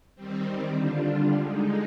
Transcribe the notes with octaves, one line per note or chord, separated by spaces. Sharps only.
D#3 G3 C4
D3 G3 D4 F4
D3 G#3 D#4